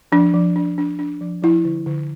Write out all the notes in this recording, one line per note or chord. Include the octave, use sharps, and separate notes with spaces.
F3 D4
F3
D4
D4
D4
F3
F3 E4
D3
D3